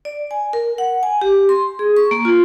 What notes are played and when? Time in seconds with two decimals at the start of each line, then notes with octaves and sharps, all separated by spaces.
0.05 D5
0.31 G#5
0.53 A#4
0.78 F#5
1.03 G#5
1.21 G4
1.49 C6
1.79 G#4
1.97 C#6
2.11 A#3
2.25 F4